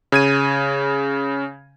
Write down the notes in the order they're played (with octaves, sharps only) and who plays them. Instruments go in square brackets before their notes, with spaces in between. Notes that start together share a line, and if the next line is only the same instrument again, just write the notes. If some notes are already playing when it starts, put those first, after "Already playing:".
[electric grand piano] C#3 G#6 D#7